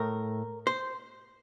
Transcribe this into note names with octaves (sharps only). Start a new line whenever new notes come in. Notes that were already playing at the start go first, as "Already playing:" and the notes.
Already playing: A2 A3 A#4
C5